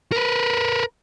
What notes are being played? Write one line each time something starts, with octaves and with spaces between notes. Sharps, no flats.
A#4 B4